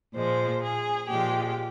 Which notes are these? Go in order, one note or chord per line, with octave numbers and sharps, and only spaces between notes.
A#2 F3 G#3 C5
G#4
A#2 F3 G#3 G4